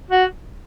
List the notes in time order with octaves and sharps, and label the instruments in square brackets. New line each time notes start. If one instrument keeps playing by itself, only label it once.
[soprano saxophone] F#4